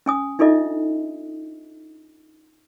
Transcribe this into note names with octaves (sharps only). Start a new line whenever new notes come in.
C#4 G#5 D#6
D4 D#4 F4 A4 D#5 E5